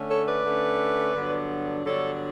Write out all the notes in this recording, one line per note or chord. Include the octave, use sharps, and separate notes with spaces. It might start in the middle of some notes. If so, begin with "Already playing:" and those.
Already playing: D3 A3 C#4
A4 C#5
B4 D5
D3 A3 C#4
G2 D3 F#3 B3 D4
G2 D3 F#3 B3 D4 A4 C#5